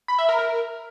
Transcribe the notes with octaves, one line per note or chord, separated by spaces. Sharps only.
B5
E5
A#4
A#4